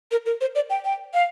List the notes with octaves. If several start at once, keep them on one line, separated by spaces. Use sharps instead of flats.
A#4
A#4
C5
D5
G5
G5
F5